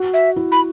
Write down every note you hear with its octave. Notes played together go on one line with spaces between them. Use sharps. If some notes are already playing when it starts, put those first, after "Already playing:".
Already playing: F#4
E5
E4
B5